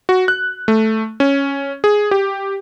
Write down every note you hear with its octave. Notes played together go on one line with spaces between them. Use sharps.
F#4
F#6
A3
C#4
G#4
G4